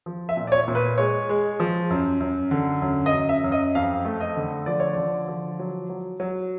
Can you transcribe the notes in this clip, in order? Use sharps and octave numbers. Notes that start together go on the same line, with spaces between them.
F3
E5
A#2
D5
C#5
A#2
B4
G#3 C#5
G#3
F3
F#2
F#2
D3
F#2
D#5
F#2
E5
F#2
D#5
F2 F5
A3
D#5
D3
F3 D5
C#5
D3 D5
F3
F#3
F#3
F#3